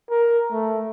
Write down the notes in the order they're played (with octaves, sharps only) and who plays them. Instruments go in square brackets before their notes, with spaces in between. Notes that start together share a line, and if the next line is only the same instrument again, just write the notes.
[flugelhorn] A#4
A3